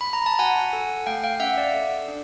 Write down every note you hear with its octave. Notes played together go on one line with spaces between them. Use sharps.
B5
A#5
A5
F#4 F#5 G#5
A4
A3 F5 G5
F5 G5
C#4 E5 F#5
D5
A4
D4